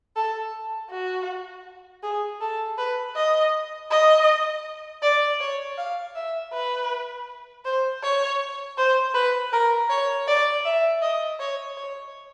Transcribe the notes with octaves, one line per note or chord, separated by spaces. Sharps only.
A4
F#4
G#4
A4
B4
D#5
D#5
D5
C#5
F5
E5
B4
C5
C#5
C5
B4
A#4
C#5
D5
E5
D#5
C#5
C#5